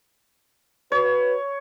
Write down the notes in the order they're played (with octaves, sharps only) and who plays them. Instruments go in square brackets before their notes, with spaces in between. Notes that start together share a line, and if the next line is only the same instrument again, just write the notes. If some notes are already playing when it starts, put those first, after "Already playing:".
[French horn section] F#4 B4 [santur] C#5